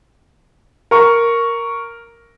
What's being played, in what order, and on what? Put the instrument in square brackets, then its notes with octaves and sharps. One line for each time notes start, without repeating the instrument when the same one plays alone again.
[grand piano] A#4 C#6